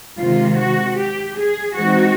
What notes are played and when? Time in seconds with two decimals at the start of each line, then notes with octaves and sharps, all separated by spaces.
0.18 C3 D#3 G#3 F4
0.57 F#4
0.97 G4
1.37 G#4
1.76 E3 G#3 C4 D#4 F#4